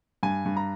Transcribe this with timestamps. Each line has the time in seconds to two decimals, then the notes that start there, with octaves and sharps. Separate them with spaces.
0.23 G2 G#5
0.46 G2
0.57 A#5